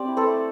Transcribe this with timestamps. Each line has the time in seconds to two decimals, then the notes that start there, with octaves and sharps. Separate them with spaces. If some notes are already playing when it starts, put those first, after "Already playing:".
Already playing: C4 G4 D5
0.08 E4
0.17 A4 C5
0.26 A3